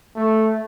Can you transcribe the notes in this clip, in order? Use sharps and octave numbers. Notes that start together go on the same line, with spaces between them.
A3